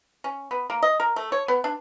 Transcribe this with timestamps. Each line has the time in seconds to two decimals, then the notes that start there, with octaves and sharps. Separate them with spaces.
0.24 C#4
0.51 B3
0.70 A#3
0.83 D#5
1.00 A#4
1.16 A3
1.32 C#5
1.48 B3
1.64 D4